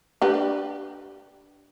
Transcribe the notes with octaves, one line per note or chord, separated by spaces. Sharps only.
D4 G4 B4